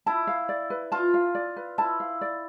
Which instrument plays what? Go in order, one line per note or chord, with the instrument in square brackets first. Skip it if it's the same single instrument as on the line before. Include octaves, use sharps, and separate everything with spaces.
[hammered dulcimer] E4 [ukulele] A5
[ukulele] F5
D5
B4
[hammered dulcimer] F4 [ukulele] A5
[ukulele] F5
D5
B4
[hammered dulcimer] E4 [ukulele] A5
[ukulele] F5
D5